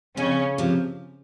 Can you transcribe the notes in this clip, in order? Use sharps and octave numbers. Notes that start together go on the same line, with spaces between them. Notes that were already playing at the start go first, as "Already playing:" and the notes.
F2 C#3 C#4
C3 F3